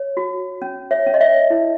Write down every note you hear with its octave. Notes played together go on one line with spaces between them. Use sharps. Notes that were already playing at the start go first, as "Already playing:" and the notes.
Already playing: C#5
F#4
C#4
C#5 E5
C#4
D#5
C#5 E5
E4